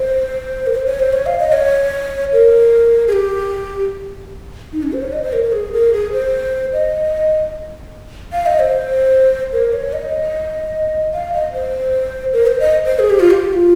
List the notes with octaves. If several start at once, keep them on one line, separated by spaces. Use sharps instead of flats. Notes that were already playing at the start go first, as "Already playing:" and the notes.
Already playing: C5
A#4
C5
C#5
C5
C#5
F5
D#5
C#5
A#4
G#4
G4
D#4
C#4
C5
C#5
D#5
C5
A#4
A#4
G#4
A#4
G#4
C5
D#5
F5
D#5
C5
A#4
C#5
D#5
F5
D#5
C5
A#4
C5
D#5
C5
G#4
G4
F4
G4
F4